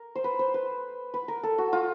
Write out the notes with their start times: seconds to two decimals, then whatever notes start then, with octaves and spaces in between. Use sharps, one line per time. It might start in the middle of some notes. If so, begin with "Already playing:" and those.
Already playing: A#4
0.16 C5
0.24 B4
0.39 C5
0.54 B4
1.14 B4
1.28 A#4
1.43 A4
1.58 F#4
1.73 F4